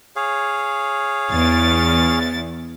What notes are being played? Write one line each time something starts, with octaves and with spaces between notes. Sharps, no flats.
G#4 C#5 F5
E2 A6